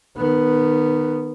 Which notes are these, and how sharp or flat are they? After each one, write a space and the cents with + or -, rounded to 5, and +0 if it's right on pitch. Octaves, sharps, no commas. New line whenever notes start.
D#3 -20 B3 +0